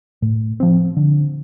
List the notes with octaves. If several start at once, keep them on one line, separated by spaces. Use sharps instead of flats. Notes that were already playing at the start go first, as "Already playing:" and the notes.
A2
F3 C4
D3